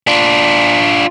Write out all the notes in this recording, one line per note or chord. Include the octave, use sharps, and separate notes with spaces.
D4 F4